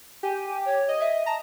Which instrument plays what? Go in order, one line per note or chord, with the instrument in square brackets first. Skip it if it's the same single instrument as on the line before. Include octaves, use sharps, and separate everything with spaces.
[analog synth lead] G4 [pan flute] G#5
[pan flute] C#5
[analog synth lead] D#5
[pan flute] E5
[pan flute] A5 [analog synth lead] A#5